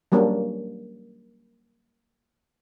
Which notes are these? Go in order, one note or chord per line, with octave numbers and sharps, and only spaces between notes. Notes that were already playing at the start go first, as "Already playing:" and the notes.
F#3 G3 A#3 C#4 D4